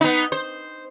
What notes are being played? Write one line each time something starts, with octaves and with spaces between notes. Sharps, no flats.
B3 D#4
C5